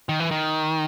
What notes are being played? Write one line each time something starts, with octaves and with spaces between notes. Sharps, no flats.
D#3
E3
D#3